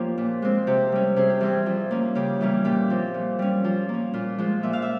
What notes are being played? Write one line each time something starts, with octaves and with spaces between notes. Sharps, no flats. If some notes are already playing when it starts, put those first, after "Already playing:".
Already playing: F3 A#3 C#4 G4
A#2
G#3 C4
C3 G4
G3 C#4
C3 G#4
G4
E3 G3 C4 G#4
F3
A#3 C#4
C#3 G4
E3 G3 A#3 C#4
A#2 G4
F3 C4
A#2
G3 C#4
F3
A#3 C#4
A#2 F4
F3 G#3
A#2 E5
F5
E5